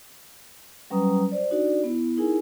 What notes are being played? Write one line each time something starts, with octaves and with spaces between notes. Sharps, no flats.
F#3 G3 C#4 B4 A#5 D#6
C5 D5
D4 D#4 F#4 D5
B3 E4
D#4 E4 G#4 A#4 G#5